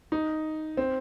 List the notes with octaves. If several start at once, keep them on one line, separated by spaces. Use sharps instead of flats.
D#4
C4